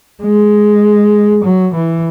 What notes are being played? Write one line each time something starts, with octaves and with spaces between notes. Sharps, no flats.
G#3
F#3
E3